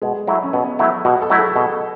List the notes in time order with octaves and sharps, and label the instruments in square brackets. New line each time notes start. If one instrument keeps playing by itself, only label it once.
[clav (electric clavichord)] B2 [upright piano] G#3
[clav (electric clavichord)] F#3 A3 E4
[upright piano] C#4
[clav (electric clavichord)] B2 [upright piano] B3
[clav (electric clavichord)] F#3 A3 E4
[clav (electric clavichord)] B2 [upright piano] F#4
[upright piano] A4
[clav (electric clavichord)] F#3 A3 E4
[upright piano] G#4
[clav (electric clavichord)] B2 [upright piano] A4